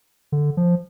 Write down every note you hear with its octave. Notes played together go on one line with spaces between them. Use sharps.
D3
F3